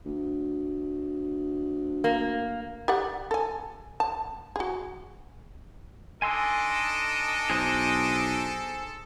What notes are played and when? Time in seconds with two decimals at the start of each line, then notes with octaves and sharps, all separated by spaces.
0.06 D2
2.04 A#3
2.88 G4 D5 F#5
3.31 A4 G#5
4.00 A5
4.56 F#4 G#4
6.22 D4 D#4 A4 D#5 G#5 C6 E6
7.50 B1 G#4 C5 D#6